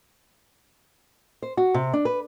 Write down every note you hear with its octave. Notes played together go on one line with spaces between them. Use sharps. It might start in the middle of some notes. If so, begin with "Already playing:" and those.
C5
F#4
C3
D4
B4